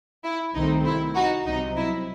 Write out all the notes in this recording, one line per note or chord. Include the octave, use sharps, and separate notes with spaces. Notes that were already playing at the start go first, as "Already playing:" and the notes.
E4
C2 C3 D#3 A3 C4 D#4
E4
D#4 F#4
C2 C3 F#3 D#4
E4